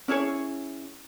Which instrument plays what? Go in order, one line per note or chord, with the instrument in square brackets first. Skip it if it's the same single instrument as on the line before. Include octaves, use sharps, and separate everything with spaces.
[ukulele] C#4 E4 G#4 C#5